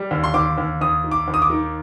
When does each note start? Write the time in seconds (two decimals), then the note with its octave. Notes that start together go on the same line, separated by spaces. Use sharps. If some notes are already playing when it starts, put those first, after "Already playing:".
Already playing: G3
0.11 D#2
0.24 C6
0.34 D#2 D6
0.58 D#2
0.81 D#2 D#6
1.04 D#3
1.11 D6
1.28 D#2
1.34 D#6
1.42 D6
1.50 D#3